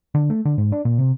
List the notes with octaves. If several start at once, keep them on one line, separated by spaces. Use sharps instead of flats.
D3
A3
D3
G#2
D4
A#2
C3